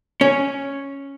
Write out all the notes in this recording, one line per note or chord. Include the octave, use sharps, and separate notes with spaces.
C#4